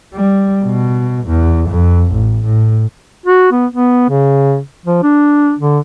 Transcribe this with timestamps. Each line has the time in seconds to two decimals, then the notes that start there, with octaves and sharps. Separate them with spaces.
0.14 G3
0.64 B2
1.27 E2
1.68 F2
2.12 A1
2.45 A2
3.26 F#4
3.51 B3
3.72 B3
4.09 C#3
4.85 F3
5.03 D4
5.59 D3